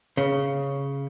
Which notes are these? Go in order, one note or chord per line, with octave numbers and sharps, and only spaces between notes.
C#3